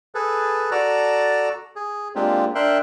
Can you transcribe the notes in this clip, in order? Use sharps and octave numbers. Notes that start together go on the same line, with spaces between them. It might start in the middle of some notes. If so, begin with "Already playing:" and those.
G#4 A4 B4
F#4 A4 D5 A5 A#5
G#4
G#3 A#3 C4 D4 F4 G4
D4 A#4 E5 G5 C6 F#6